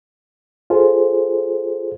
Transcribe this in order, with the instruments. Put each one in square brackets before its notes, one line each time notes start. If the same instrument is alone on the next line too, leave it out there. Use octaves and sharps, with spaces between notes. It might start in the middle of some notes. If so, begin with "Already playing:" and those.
[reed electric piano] F4 G#4 A4 C5